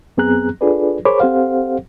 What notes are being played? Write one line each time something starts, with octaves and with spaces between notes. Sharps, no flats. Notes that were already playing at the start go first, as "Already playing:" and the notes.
F#2 B3 C4 G#4 A#5 F#6
D4 F4 G#4 A4 B4 D5
G#4 A#4 C5 C#5 B5 D6
C4 G4 A4 C5 F5 F#5